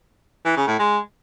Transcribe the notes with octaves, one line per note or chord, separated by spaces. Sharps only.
E3
C#3
A2
G#3